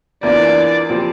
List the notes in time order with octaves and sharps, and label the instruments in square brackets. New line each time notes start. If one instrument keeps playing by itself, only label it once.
[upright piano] E2 E3 A#3 D4 F4 [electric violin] D5
[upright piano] A#2 F3 C4 G4